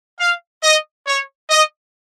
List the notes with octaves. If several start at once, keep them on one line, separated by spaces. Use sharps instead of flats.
F5
D#5
C#5
D#5